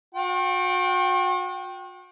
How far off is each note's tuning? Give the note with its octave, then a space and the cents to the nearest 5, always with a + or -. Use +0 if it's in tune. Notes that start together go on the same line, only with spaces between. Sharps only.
F#4 -40 G5 -10